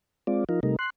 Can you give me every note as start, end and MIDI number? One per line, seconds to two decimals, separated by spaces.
0.27 0.44 56
0.27 0.44 60
0.27 0.44 65
0.27 0.44 74
0.49 0.60 53
0.49 0.60 63
0.49 0.60 65
0.49 0.60 70
0.63 0.76 48
0.63 0.76 55
0.63 0.76 57
0.63 0.76 63
0.63 0.76 70
0.79 0.90 84
0.79 0.90 90